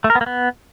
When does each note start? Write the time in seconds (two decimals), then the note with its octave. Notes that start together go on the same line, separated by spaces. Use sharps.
0.04 A3
0.10 A#4
0.15 B3
0.21 A#3
0.26 B3